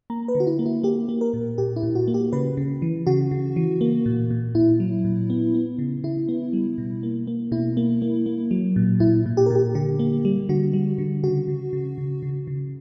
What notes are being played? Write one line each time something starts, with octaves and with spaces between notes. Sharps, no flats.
A#3 A#5
B4
D3
F#4
E4
A#3
E4
A#3 G4
A#3
A#4
A#2
A#2 G4
E4
A#2
F#4
A#3
G4
C#3 B4
C#3
E3
C#3 F#4
C#3
E3
A#3
A#2
A#2
A#2 E4
F#3
A#2
B3
B3
C#3
C#3 E4
B3
G3
B2
A#3
A#3
B2 E4
A#3
A#3
A#3
F#3
A#2
A#2 E4
A#2
G4
A#4
A#2 G4
D3 G4
A#3
G3
D3 F#4
G3
D3
C#3 F#4
C#3
C#3
C#3
C#3
C#3